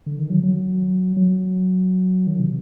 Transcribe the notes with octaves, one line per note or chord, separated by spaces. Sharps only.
D3
D#3
F#3
F#3
F#3
D#3
C3